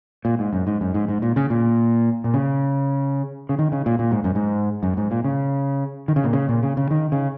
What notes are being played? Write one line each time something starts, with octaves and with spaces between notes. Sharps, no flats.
A#2
G#2
F#2
G#2
F#2
G#2
G#2
A#2
C#3
A#2
A#2
C#3
C#3
D#3
C#3
A#2
A#2
G#2
F#2
G#2
F#2
G#2
A#2
C#3
D#3
C#3
A#2
C#3
A#2
C#3
C#3
D#3
C#3